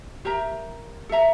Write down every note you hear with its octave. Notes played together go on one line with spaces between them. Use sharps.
G4 A#4 E5 A#5
A4 E5 A#5